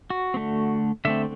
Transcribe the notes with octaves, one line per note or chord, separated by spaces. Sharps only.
F#4
C4
D3 A3
D3 A3 C4 E5